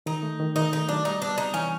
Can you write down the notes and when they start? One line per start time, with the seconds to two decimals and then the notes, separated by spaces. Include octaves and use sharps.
0.06 D#3 D#4
0.23 A3
0.39 D#3
0.56 D#3 D#4
0.72 A3 D#4
0.89 F#3 D4
1.05 G3 D#4
1.22 B3 D4
1.38 C3 D#4
1.54 E3 C#4